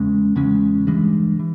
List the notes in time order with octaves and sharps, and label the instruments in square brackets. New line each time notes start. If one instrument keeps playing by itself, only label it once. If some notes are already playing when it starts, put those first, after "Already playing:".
Already playing: [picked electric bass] E2 C#3 G#3 C#4
E2 C#3 G#3 C#4
G2 E3 G#3
E3